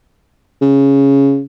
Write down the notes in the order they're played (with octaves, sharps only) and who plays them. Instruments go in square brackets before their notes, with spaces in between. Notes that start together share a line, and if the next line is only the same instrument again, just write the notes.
[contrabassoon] C#3